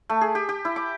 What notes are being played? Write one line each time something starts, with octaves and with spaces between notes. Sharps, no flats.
A3
G#4
G4
G4
E4
D6